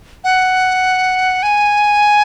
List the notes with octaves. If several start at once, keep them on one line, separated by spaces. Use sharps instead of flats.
F#5
G#5